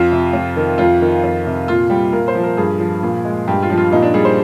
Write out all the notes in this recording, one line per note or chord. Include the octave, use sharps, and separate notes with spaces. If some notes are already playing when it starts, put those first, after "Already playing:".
Already playing: F2 F4
C3
F2
D#3
F2 F4
D#3
F2
C3
A#2 F4
G3 G4
A#2 A#4
C5
F3
A#4
G2 G#4
F3
A#2
G#3
G2 G4
F4
F3
F4
A#2 D#4
D4
G3 G#4
C5